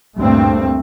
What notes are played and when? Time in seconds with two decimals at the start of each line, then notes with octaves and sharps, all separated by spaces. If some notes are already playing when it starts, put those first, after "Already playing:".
0.16 D2 G2 A#2 A3 C4